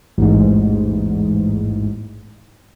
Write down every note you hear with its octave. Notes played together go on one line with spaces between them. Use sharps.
A1 E2 G#2